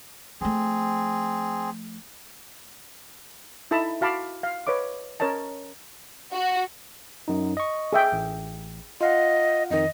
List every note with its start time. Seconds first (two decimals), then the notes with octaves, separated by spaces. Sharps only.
0.41 F3 A3 C4 G#4
3.71 D#4 E4 A4 A5 B5 E6
4.01 F#4 F5 A5 B5 D6
4.43 F5
4.67 B4 C#5 D#5 D6
5.20 C#4 A#4 C#5 D#5 A5
6.33 F#4
7.28 F#2 D#4
7.57 D#5 C#6
7.93 G#4 E5 G5
8.12 A1
9.01 F4 D#5 F5 F#5
9.71 F2 D#3 D#5